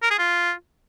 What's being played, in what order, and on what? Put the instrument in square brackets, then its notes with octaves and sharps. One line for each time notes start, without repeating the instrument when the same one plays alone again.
[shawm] A#4
G#4
F4